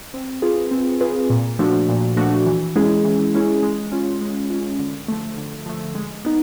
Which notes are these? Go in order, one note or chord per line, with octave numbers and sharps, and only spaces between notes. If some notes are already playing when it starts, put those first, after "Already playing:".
C4
F4 G#4 B4
C4
F4 G#4 B4
A#2
F3 A3 D4 F#4
A#2
F3 A3 D4 F#4
E3
G#3 C#4 E4 G#4
E3
G#3 C#4 E4 G#4
G#3
C#4 F4
G#3
C#4 F4
D3
F3 A3
D3
F3 A3
G#3
B3 D#4